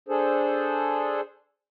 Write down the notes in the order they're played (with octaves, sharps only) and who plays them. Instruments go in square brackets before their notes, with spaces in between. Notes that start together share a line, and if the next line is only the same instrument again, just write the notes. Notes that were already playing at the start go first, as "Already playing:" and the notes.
[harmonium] D4 G#4 A4 C5